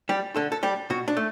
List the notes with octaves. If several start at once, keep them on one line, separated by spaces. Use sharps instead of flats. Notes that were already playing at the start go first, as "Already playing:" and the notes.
G3 G4
D3 A4
A4
G3 G4
B2 F#4
D4
A3